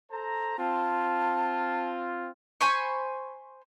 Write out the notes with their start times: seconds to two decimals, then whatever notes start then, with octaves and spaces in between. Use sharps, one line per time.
0.11 A4 C5 A#5
0.58 C4 F4 A5
2.61 C5 G#5 B5 C#6